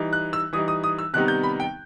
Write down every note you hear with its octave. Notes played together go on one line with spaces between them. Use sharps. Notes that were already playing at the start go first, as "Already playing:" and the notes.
Already playing: E3 G3 D#4
F#6
E6
E3 G3 D#4 D#6
D#6
D#6
E6
C3 D#3 G3 B3 D#4 F#6
G6
B5
G5